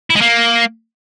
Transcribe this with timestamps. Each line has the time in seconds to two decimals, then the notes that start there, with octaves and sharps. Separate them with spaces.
0.10 E4
0.16 G#3
0.21 A#3